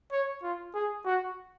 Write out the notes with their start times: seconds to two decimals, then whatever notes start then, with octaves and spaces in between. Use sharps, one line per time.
0.12 C#5
0.43 F4
0.74 G#4
1.05 F#4